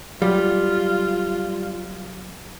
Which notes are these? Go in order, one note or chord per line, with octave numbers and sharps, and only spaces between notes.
F#3 G3 F4